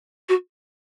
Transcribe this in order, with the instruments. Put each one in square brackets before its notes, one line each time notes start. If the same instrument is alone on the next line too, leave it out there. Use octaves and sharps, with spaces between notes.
[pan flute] F#4